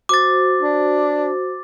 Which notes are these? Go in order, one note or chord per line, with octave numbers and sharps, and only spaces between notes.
F#4 C5 D6 A6
D4